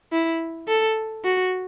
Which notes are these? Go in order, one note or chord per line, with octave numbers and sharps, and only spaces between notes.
E4
A4
F#4